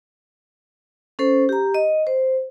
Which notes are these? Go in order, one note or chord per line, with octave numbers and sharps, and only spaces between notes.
C#4 A4 C5
G4 A#5
D#5
C5